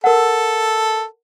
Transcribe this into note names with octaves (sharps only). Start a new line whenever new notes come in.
A4 A#4 F#5